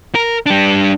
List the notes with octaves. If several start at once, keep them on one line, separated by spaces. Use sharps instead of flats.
A#4
G3 D4